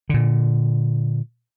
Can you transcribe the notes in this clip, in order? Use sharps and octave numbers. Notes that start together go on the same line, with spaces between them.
A#2 D3